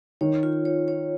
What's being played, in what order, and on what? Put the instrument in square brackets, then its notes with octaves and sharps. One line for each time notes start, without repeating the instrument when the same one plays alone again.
[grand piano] D#3 [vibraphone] C#5
[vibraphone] F4
C#5
C#5